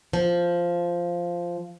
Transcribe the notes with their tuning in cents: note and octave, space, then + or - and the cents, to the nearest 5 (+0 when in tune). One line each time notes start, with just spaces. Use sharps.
F3 -5